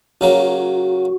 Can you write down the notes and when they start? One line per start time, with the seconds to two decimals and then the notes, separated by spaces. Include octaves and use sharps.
0.21 C#3 F#3 A#3 F#4